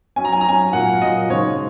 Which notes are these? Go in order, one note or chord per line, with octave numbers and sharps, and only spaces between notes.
F#3 C#4 G#5
A#5
G#5
A#5
F#3 C#4 G#5
A#2 F#3 A#3 F#5
A#2 F#3 A#3 D#5
C#3 G#3 D#4 C#5